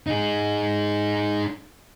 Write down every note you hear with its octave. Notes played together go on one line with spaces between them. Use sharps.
D#4 G#4